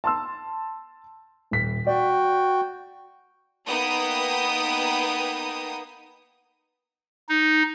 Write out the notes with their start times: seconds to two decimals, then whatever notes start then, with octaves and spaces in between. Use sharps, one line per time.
0.04 A5 C6 E6
1.51 D#1 B6
1.87 F#4 D5 G5
3.68 A#3 B3 D#4 B4 G5 D#6
7.29 D#4